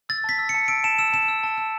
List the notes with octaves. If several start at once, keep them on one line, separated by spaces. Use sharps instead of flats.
E6 A6
A5 B6
E6
C#7
A5
E6 D7
A5 E7
E6 E7
A5 E7
E6
A5
E6